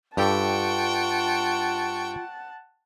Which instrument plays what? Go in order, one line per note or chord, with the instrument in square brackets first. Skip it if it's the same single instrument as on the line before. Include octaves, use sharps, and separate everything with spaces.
[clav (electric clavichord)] G2 G4 A4 [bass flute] F4 [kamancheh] F#5 A5 [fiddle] G5 C#6